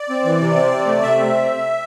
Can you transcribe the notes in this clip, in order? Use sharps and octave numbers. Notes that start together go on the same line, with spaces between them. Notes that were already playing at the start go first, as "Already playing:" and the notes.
Already playing: D5
C4
E3
C3
C4
C3
A3
C3 E5
C4